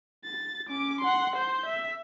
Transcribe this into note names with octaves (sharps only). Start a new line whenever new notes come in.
A6
C#4 D6
F#5 C6
C5 G6
E5